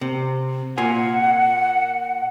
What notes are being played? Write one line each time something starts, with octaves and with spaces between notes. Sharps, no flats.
C3
A#2 F4 F#5 G#5